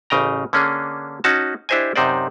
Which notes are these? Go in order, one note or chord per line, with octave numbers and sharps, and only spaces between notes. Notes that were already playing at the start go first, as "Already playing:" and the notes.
A1 C#3 D#5 G5 A#5
D3 A#3 C#4 D4 G#4
C#4 D#4 F#4 A5
D4 E4 G4 C5 D#5 G#5
F#2 C3 D#4 C5 D5